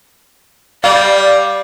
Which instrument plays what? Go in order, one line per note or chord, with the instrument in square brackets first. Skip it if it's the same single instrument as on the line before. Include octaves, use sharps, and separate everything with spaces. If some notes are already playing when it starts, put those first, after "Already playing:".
[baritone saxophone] G3 [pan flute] D5 [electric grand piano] F5